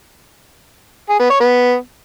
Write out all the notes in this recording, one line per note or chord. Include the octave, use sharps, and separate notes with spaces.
G#4
B3
C#5
B3